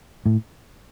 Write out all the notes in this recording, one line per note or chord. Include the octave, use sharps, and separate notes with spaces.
A2